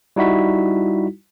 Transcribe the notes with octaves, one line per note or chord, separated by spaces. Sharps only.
G3 D#4 E4 F#4 B6